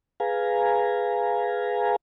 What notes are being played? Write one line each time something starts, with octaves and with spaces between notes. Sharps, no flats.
G#4 B4 F5 G#5 A#5